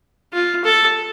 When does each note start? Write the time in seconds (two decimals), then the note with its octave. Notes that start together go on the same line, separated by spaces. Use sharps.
0.33 F4
0.64 A4